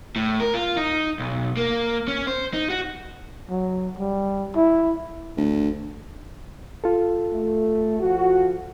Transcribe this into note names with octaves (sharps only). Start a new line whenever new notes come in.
A2
A#4
F4
D#4
B1
A#3
C#4
C5
D#4
F#4
F#3
G3
E4
D2
F4 A4
A3
F3 F#4